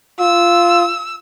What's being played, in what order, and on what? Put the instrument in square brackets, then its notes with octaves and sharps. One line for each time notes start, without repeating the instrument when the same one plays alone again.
[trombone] F4 [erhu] E6